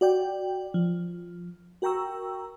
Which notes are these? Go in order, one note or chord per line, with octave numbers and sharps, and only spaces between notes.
F#4 D5 G5
F3
F#4 A#4 G5 A#5 C#6 E6